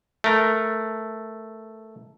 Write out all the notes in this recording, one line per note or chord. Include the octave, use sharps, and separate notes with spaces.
A3 A#4